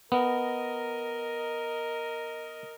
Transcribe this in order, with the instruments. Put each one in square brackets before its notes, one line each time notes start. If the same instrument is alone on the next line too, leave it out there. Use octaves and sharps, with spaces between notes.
[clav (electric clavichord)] B3 [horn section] A#4 D#5